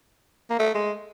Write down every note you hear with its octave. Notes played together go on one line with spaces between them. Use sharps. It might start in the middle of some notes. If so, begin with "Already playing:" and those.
A#3
A3
G#3